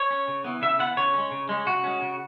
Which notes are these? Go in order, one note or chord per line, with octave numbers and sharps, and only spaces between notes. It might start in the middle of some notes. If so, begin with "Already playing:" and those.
Already playing: C#5
C#4
C#3
E3 B3
C#3 E5
E3 B3 F#5
C#3 C#5
G#3 C#4
C#3
G#3 C#4
C#3 F#4
G#3 C#4
C#3